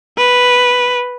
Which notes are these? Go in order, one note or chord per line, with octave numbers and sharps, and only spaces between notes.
B4